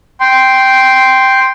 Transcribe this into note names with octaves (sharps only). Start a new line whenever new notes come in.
G5 C6